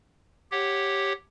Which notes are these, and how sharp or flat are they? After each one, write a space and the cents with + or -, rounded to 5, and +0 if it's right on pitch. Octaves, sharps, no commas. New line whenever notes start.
G4 +0 C#5 -10 F#5 +0